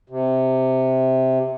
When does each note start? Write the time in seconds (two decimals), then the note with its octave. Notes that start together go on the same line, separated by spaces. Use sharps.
0.10 C3